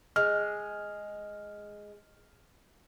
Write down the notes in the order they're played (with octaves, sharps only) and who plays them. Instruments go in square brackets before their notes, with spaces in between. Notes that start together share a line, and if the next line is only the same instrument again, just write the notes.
[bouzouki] G#3 [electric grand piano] F6